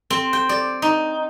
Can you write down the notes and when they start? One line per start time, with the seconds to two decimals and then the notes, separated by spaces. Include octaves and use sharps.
0.10 C4
0.33 G5
0.49 D5
0.82 D#4